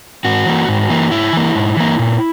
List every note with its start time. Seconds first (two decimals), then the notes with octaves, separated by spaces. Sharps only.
0.25 G#2 F#4
0.46 E3 A#3
0.68 G#2
0.90 E3 A#3
1.11 G#2 E4
1.33 E3 A#3
1.55 G#2
1.77 E3 A#3
1.99 A#2